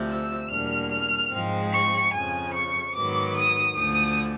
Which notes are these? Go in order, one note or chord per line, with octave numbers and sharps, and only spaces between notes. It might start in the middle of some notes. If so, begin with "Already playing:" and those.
Already playing: D2 C3 F3
E6
E2 B2 G3 A#3 D4 F6
F6
G#2 F3 G#3 C4
C#6
F2 C#3 F3 G#5
C#6
G#2 D#3 F#3 B3 D6
D#6
D2 D3 F3 D#6